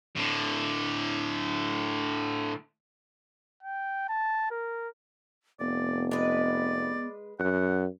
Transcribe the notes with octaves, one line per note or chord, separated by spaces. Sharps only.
A2 D3
G5
A5
A#4
F1 B3 D5
G#3 B4 D5
F#2 F#5